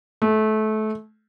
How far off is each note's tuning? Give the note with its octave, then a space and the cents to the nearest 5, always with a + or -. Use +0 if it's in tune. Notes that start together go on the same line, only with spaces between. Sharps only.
A3 -25